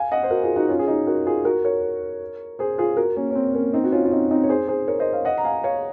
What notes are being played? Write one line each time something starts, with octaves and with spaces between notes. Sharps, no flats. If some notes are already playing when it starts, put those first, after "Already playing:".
Already playing: F5 G#5
D#5 F#5
C5
F#4 A#4
F4 G#4
D#4 F#4
C#4 F4
G#4
D#4 F#4
F#4 A#4
F4 G#4
F#4 A#4
A#4 C#5
G#4 C5
F4 G#4
F#4 A#4
A#3 C#4
C#4
C4
A#3 C#4
C4 D#4
F#4
C#4 F4
F4
C4 D#4
C4 D#4
C#5
G#4 C5
G#4 C5
A#4 C#5
C5 D#5
C#5 F5
D#5 F#5
A#5
F5 G#5
C#5 F5